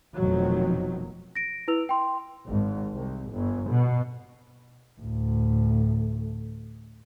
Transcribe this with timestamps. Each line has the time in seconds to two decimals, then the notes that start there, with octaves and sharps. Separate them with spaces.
0.16 F1 F2 B2 D#3 F#3
1.35 A#6 D7
1.68 E4 B4 E6 F7
1.89 G5 C6
2.47 G#1
2.96 C2
3.32 G1
3.70 B2
5.00 D2 A2